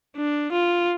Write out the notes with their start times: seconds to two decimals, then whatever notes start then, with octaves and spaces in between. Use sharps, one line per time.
0.17 D4
0.52 F4